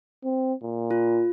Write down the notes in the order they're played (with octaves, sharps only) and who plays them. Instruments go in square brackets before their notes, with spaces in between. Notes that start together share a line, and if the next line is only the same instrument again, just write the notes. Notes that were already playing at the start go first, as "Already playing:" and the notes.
[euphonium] C4
A#2
[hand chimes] F4